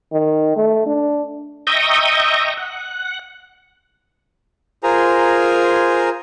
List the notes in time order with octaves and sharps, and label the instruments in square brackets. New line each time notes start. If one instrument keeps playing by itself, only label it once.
[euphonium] D#3
A3
D4
[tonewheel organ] D#5 E5 G5 A#5 C#6 D#6
F#5
[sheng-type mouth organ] F4 G#4 A#4 C5 G#5 A#5